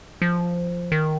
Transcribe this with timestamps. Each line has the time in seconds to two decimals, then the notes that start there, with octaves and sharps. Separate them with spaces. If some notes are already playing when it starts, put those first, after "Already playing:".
0.22 F3
0.92 D#3